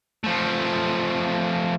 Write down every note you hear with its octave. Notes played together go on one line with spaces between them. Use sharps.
F3 A3